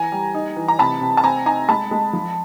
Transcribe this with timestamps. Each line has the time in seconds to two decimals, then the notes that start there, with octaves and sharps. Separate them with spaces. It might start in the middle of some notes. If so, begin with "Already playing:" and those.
Already playing: E3 G#5 A#5
0.12 G3
0.35 D#4
0.56 E3
0.68 A#5
0.79 C3 A5 B5
1.01 C3
1.17 A5
1.24 C4 G#5 A#5
1.46 D#4 G#5 A#5
1.69 G#3 A5 B5
1.91 G#3
2.13 F3